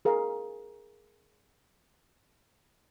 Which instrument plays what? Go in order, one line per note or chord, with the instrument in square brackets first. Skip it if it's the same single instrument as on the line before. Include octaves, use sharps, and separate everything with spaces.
[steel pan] G#4 A#4 F5